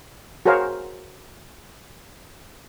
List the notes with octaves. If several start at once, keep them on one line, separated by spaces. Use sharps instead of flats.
F#4 G#4 A#4 C5 C#5 F5